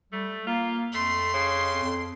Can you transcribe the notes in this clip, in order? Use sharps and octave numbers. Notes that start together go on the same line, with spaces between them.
G3 A3
A#3 F4
F2 A3 C6
C#3
F2